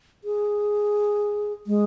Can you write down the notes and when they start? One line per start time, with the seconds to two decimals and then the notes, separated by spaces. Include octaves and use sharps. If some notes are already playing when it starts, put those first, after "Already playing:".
0.24 G#4
1.67 G#3